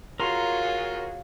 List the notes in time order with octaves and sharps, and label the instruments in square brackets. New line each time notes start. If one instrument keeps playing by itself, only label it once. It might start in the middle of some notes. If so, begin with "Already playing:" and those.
[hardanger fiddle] F4 [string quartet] F#4 G#4 C#5 [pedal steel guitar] A#4 A#5 C6